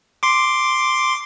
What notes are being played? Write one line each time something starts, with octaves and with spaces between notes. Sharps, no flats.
C6 D6